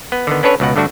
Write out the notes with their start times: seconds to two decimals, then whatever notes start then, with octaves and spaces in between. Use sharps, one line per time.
0.12 B3
0.27 D3 D#3 B3
0.43 B3 C#4 D4 A4 B4 C#5
0.60 C#2 B2 F#5
0.76 G2 D3 A3 D4 F#4